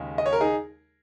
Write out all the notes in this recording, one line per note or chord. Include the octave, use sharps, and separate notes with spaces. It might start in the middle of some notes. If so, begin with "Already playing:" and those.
Already playing: D#2 C#3 G#3
D#5
C#5
A#4
D#4 G#4